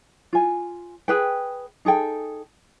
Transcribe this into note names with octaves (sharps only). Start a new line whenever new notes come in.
F4 G#5
G#4 B4 G5
D#4 G#4 A4 G5